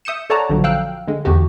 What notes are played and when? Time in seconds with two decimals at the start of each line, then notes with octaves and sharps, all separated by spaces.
0.05 E5 D#6 G6 C#7 E7
0.30 A4 C#5 D5 F#5 A5 A#5
0.50 A#1 D3 F3 F#3
0.64 F5 G5 E6 F#6
1.08 D3 G#3
1.25 E2 D3 F#4 G4